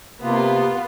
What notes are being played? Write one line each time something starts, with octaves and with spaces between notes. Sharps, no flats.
C3 A#3 B3 F4